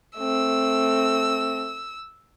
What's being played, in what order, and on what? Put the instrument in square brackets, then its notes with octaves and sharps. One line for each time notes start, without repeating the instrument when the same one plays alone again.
[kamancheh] A3 C4 [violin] E6